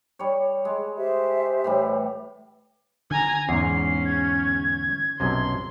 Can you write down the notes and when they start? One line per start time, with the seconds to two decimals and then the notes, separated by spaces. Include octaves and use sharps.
0.19 G3 C#5
0.65 G#3
0.97 G4 C5 E5
1.64 A2 E3 G3
3.11 D3 G#5 A#5
3.49 E2 G#2 C#4 C7
4.05 G#6
5.20 B1 F#2 C3 C6